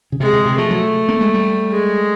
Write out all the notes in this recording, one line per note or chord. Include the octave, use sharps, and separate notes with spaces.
C#3
C3 G#3
C3
C3
F3 A3
F#3
A#3
G#3
G3
G#3